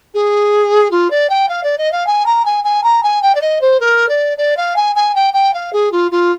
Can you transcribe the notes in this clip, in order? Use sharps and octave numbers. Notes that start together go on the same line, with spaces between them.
G#4
F4
D5
G5
F5
D5
D#5
F5
G#5
A#5
G#5
G#5
A#5
G#5
G5
D5
D#5
C5
A#4
D5
D5
F5
G#5
G#5
G5
G5
F5
G#4
F4
F4